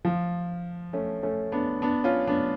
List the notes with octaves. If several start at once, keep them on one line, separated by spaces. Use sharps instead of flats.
F3
A3 C#4
A3 C#4
B3 D4
B3 D4
C#4 F4
B3 D4